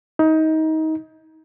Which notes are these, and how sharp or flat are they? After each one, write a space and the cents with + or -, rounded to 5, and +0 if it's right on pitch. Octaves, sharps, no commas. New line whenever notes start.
D#4 +25